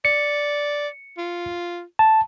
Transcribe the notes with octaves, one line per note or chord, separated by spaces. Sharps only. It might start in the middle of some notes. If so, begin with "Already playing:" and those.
D5 C#7
F4
A5